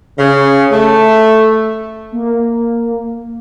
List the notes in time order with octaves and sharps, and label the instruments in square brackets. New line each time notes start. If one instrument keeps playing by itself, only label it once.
[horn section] C#3
A3
[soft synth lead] A#3